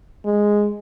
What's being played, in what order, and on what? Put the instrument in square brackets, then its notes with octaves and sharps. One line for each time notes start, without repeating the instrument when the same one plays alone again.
[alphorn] G#3